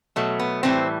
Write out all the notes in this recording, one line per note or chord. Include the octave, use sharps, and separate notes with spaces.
B2 F#3 A3
B3
A2 E3 G3 C4